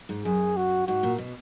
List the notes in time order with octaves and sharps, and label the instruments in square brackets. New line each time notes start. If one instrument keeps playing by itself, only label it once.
[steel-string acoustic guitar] G#2
[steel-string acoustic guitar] F#2 [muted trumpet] G#4
[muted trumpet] F#4
[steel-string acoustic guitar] G#2 [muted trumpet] F#4
[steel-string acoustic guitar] A#2
B2